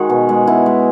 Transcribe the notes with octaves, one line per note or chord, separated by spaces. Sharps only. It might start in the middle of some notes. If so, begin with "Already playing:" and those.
Already playing: D#3 G#3 F#4 G#4
B2
G#3
B2 E4
G#3